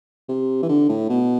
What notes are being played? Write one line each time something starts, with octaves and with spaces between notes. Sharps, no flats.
C3
E3
D3
A2
B2